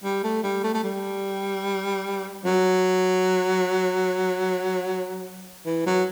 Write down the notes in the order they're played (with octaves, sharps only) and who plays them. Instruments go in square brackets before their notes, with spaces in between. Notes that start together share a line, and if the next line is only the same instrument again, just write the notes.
[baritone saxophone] G3
A3
G3
A3
A3
G3
F#3
E3
F#3